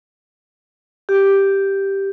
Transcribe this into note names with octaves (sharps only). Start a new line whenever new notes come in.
G4